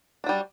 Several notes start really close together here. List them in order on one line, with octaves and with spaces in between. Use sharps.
D4 F#3 G3